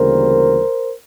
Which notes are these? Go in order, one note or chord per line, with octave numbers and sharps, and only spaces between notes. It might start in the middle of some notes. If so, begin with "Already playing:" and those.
Already playing: D2 C#3 E3 G3 A#3 A#4 C5